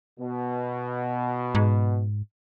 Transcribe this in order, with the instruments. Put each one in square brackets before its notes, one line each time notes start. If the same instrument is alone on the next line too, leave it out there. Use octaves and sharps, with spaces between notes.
[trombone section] B2
[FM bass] G#2